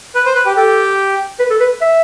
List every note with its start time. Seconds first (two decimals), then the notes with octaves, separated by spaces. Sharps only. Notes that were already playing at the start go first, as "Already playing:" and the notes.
0.15 B4
0.26 C5
0.35 B4
0.45 G4
0.56 G4 A4
1.40 B4
1.50 A4
1.60 B4
1.81 E5